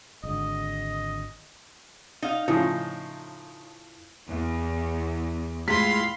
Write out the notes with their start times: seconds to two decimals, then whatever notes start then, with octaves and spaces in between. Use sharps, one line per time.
0.23 G#1 D3 D#5
2.22 D#4 F5
2.48 A2 C#3 F3 D#4
4.28 E2
5.68 A2 G#3 F4 F5 B5 C6 B6